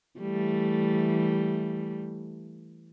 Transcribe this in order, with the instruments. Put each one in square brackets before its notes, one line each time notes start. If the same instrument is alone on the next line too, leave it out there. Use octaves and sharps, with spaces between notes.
[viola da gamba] E3 G3 A3